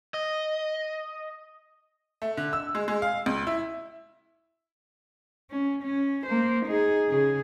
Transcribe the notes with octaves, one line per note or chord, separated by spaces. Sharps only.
D#5
A3
D3
E6
G#3
G#3
F5
C#2
E4
C#4
C#4
A#3 C5
D#4 G#4
C#3 G#4